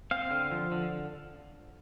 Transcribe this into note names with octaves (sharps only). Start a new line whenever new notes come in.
C4 F5
D3
F3
D3